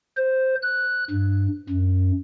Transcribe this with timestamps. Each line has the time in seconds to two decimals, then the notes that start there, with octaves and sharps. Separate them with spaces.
0.17 C5
0.63 F#6
1.10 G2
1.70 F#2